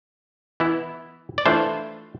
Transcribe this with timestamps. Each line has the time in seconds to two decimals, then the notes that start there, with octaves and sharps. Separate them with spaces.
0.60 E3 B3 E4
1.38 D5
1.46 E3 A3 D4 F4 C5